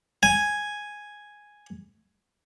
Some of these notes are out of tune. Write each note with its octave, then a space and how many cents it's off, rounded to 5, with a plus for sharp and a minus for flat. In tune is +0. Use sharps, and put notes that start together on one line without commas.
G#5 +0